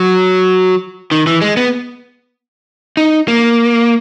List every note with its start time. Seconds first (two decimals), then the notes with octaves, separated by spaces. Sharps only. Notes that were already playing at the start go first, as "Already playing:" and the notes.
Already playing: F#3
1.11 D#3
1.27 E3
1.41 G#3
1.57 B3
2.97 D#4
3.28 A#3